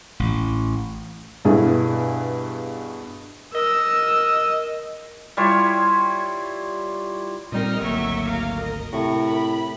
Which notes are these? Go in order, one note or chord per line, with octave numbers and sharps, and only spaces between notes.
A1
G2 B2 E4 G#4
A#4 D#5 E6
G3 E4 F4 C#5
A#2 G3 C4 D#4 A#4 D#5 F6
G#1 D2 F#3 A#3 E5 C#6
F5 A#5
A#4 D#5
A2 C3 C#6
B5